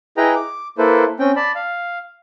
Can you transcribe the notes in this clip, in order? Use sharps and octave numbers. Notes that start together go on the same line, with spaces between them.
E4 G#4 B4 D#5 G5 A#5
D6
A#3 E4 A4 B4 C5
C4 C#4 G5
D5 A5 B5
F5